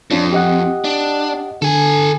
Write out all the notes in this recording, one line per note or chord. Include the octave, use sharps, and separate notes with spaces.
F2 C#4 D4 F4
G4 D#5 F#5
D4
D3 A4 G#5